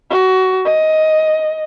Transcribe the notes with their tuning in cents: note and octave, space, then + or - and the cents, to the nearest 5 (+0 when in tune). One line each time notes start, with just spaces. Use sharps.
F#4 +20
D#5 +10